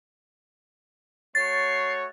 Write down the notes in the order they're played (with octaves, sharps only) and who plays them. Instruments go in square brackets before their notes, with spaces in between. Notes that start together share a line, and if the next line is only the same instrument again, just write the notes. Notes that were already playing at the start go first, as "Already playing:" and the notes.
[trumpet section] A3 F#4 C#5 [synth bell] A6 [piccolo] C7